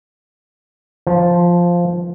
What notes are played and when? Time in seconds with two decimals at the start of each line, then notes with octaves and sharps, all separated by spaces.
1.07 F3